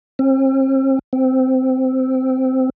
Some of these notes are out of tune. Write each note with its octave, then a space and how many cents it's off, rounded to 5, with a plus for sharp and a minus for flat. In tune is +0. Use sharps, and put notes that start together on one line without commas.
C4 +40
C4 -10